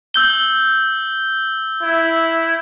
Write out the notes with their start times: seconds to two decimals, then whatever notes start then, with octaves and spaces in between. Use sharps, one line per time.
0.14 E6 G6 G7
1.83 E4